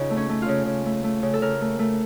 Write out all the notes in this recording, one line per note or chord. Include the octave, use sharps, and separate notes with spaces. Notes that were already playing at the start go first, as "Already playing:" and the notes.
Already playing: C#3 D#4 F4
A3
C#4
A3
F4
C#3
C#3
A3
A3
C#3
A4
C#3 A#4
A3
A3